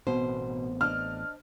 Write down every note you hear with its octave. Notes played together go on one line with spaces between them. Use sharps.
A1 B2 B3 C4 C5
D4 D#5 F6